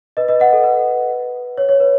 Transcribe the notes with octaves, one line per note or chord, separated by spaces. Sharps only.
B4 D#5
B4 D#5
D#5 F#5
A4
B4
C#5
C#5
B4